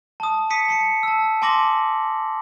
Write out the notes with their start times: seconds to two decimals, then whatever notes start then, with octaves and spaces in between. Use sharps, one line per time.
0.20 A5 D#6
0.50 D#6 B6 C#7 D#7
0.68 A5 C7 C#7
1.03 A5 E6
1.42 G#5 A5 C6 D6 A#6 F#7